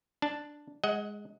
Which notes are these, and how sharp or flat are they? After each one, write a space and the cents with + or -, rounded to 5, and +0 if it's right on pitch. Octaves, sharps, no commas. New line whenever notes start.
D4 +0 A5 +0
G#3 -5 D#5 +30 F#5 +0